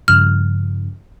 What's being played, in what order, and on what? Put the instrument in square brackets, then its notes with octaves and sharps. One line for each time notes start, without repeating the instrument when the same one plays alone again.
[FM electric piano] G2 C#3 F3 [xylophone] F6